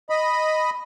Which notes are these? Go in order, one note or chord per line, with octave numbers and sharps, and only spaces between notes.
D#5 B5